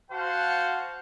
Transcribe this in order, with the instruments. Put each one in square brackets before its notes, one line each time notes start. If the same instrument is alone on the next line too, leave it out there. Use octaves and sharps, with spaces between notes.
[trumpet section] F#4 C5 F5 F#5 A5